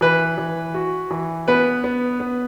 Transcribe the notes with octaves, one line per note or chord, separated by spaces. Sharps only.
E3 B4
E3
F#4
E3
B3 B4
B3
B3